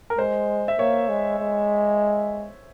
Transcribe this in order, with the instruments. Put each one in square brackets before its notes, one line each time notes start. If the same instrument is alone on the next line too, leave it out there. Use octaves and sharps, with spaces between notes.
[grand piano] A#4
[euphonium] G#3 [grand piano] C5
[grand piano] E5
[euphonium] A#3 [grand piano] C#5
[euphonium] G#3
G#3